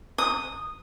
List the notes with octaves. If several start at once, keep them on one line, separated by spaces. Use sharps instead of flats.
D#6